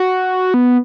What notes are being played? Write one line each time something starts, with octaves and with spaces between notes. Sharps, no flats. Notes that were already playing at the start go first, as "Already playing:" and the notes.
Already playing: F#4
B3